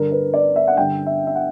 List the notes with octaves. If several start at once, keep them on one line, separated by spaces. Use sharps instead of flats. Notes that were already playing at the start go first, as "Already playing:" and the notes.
Already playing: G2 D3 A#4
B4
D5
E5
F#5
G2 D3 G5
E5
E5
F#5